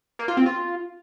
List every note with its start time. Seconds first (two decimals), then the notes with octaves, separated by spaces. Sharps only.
0.19 A#3
0.28 F4
0.37 C4
0.46 F4